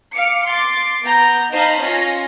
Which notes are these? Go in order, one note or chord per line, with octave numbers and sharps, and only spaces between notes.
F5 D6 C#7
C6 D6 A6
B3 A#5 G6
D#4 C5 D#5 F5 A5 B5
C#4 F4 A#6